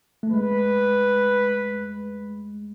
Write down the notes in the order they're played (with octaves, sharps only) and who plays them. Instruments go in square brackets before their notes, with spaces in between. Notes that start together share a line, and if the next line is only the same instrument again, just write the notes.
[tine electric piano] A3
[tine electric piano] G#3 [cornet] B4